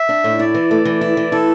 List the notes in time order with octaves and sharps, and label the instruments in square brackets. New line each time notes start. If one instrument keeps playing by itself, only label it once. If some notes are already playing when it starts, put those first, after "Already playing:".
Already playing: [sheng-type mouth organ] E5
[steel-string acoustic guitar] D4
A2
[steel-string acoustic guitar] E4 [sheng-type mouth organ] D5
[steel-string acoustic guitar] E3
A3
E3
E4
E3
[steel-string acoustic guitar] E4 [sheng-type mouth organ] A4